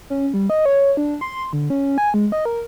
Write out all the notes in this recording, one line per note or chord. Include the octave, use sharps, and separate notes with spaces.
C#4
G3
D#5
C#5
D4
C6
D3
C#4
G#5
G#3
D#5
A#4